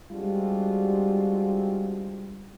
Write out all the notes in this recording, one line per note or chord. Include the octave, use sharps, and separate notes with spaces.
G3 G#3 C4 D4 F4 F#4